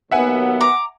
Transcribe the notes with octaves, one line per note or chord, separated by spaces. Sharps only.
D#2 F#3 B3 E5 F#5 G#5
A#5 D6